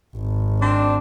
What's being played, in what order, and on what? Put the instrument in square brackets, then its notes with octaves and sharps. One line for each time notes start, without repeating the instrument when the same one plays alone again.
[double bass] G#1
[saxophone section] C4 D4